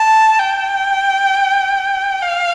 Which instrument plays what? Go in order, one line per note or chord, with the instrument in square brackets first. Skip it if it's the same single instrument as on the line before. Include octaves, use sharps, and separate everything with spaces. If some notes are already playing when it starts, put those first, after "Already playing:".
Already playing: [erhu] A5
G5
F5